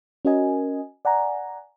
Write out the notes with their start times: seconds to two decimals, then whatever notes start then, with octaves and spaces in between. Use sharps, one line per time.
0.25 C#4 F#4 A#4 D#5 G#5
1.05 D5 F#5 G#5 A#5